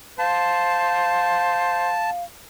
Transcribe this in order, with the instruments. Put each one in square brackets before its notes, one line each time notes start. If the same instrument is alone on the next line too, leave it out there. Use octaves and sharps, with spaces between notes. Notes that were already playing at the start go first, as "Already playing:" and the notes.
[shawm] C5 [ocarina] F5 [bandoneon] A5